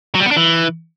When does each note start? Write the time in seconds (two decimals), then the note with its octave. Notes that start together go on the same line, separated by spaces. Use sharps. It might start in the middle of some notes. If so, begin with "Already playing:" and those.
0.15 F#3
0.20 G3
0.26 B3
0.31 D4
0.37 E3